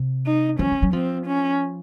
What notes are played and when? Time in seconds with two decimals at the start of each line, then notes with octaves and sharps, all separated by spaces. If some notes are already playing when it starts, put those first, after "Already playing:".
Already playing: C3
0.26 D#4
0.59 F3 C#4
0.71 F3
0.82 F#3
0.93 F3 C4
1.27 C#4